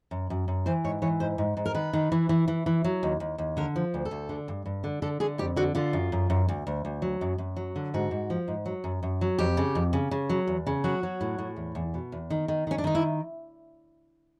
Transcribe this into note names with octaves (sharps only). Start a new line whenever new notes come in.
F#2
F#2
F#2
E3 C5
G#2 C#5
E3 C#5
G#2 C5
G#2
G#2
A#4
D#3 B4
D#3
E3
E3
E3
E3
F#3
D#2
D#2
D#2
D3 A#4
F3
D2
A4
D2
D3
G2
G2
D3
D3 A4
D3 G#4
F2 G4
D3 F#4
D3 F4
F#2
F#2
F#2
D2
D2
D2
F#3
F#2
F#2
F#3
D3
G#2 F#4
G#2
F3
G#2
F#3
F#2
F#2
F#3
F2 G4
C#3
F2
C#3
C#3
F#3
E2
C#3
F#3 F#4
F#3
A2
A2
E2
E2
B2
E2
D#3
D#3
D#3 C#4
D4
D#3 D#4
E4